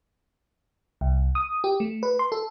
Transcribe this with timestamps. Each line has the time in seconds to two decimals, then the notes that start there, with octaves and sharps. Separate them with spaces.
1.01 C2
1.35 D#6
1.64 G4
1.80 A3
2.03 B4
2.19 C6
2.32 A4